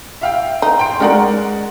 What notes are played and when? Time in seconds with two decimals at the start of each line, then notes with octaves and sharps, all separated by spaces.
0.21 E5 F5 G5
0.62 D#4
0.79 G5 C6 D7
1.00 G#3 C#4 D#4 A#4 D5 F#5